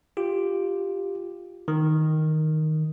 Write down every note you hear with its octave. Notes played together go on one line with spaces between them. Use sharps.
F4 G4
D#3